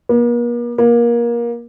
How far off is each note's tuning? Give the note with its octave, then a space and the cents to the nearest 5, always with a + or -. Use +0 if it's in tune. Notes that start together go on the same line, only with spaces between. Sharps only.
A#3 +45
A#3 +25